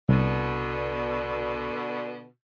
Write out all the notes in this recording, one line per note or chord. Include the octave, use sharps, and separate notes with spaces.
C2 B2 D3